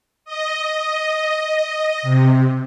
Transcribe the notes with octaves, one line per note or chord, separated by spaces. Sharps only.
D#5
C3